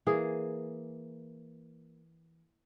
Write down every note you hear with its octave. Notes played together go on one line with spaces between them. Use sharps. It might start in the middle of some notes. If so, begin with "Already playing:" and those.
E3 A#3 G#4